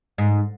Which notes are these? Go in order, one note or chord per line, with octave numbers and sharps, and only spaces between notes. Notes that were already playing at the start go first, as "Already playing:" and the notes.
G#2